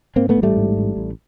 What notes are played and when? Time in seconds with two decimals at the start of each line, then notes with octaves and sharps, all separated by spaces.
0.16 G#2 A#3 C4
0.29 A3 B3
0.37 A1
0.43 G3 A3
0.57 G#2
0.77 A1
0.97 A1